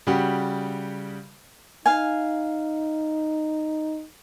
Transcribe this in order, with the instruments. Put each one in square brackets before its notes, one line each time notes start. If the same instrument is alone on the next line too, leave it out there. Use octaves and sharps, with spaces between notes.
[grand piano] C#3 G3 F#4 G4
[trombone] D#4 [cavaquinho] F5 G#5